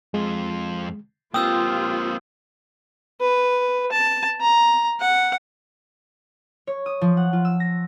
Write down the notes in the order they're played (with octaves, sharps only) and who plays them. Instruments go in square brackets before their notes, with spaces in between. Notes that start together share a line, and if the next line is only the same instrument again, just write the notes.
[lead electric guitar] F2 F4 [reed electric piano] G#3
[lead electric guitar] A#3 C4 [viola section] F4 G4 [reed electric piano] G5 [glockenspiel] D#6 E6 G6
[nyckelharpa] B4
A5
A#5
F#5
[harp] C#5
D#6
F3
F#5
F4
E6
A#6